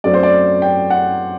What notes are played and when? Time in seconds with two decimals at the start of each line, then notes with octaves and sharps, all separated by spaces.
0.04 F#2 F#3 A3 C4 D5
0.14 C5
0.23 D5
0.62 G5
0.90 F#5